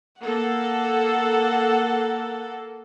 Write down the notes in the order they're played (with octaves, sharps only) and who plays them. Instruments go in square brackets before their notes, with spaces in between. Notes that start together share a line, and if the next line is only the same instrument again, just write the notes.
[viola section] A#3 A4 [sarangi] F#5